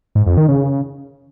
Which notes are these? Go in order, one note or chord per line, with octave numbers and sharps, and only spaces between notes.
G#2
F2
D#3
C#3